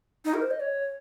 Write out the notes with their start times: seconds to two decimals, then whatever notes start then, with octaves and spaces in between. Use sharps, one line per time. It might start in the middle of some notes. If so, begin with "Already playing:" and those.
0.25 D#4
0.34 A#4
0.42 C5
0.51 D#5
0.60 C#5